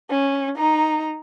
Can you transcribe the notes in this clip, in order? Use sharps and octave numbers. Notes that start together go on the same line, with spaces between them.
C#4
D#4 A#5